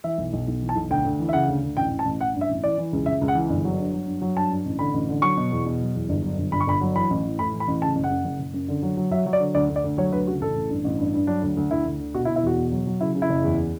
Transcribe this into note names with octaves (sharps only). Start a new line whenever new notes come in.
E3 E5
B1
B1
B1
E3
A5
B1
D2 G5
D2
E3
E5
C#3 F#5
D2
D2
A1 G5
A1
A5
A1
A1 F#5
G2
E5
A1
E3 D5
E3
C#2
C#2 E5
C#2
F#5
E3
G1
F#3
G2
F#3
G2
F#3
G2 A5
G2
A1
D3 B5
A1
D3
F#3 C#6
B2
E2
B2
F#3
E2
G1
F#3
G1
G1 B5
C#6
G1 B5
F#3
E3 B5
A1
E3
A2 B5
E3
B5
A1
C#3 A5
F#1
F#5
F#2
F#1
F#1
F#2
D3
F#3
F#3
F#3 E5
F#3
D5
D3
D2 D5
D2
D5
D2
F#3 C#5
D2 B4
C#3 F#4
A1 A4
A1
G2
A1
G2
G2
F#3 D4
D2
D2
D2 E4
D2
D3
B2 F#4
E4
B2
E4
E2 F#4
B2
F#3
F#3
C#3 E4
C#3
E4
F#1
E2